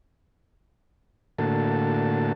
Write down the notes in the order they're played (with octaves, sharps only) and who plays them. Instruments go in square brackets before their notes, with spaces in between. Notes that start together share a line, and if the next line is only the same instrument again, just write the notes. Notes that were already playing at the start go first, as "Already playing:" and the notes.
[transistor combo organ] A2 D3 A#3 F#4 A4 A5